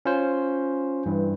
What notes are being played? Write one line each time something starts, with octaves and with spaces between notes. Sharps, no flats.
C#4 F4 C5
G2 E3